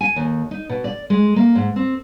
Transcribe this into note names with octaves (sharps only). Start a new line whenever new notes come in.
G#5
D#2
D#4
B2
D5
G#3
A#3
G#2
C4